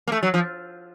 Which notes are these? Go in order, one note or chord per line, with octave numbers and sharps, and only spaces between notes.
A#3
A3
F#3
F3